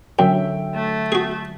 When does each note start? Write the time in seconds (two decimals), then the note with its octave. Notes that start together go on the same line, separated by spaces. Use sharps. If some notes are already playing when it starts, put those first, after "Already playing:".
0.19 F#2 D3 F#3 E5 G5
0.75 A3
1.12 F#4 G#4